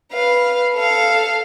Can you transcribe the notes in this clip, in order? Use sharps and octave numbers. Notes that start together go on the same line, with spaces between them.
B4 F5
A4 F5